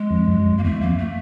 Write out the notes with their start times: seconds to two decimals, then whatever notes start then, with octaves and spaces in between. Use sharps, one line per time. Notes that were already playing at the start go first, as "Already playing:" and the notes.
Already playing: G#3
0.10 F2
0.28 F#2
0.46 F#2
0.58 A#3
0.64 E2 A3
0.80 F2 A#3
0.98 A3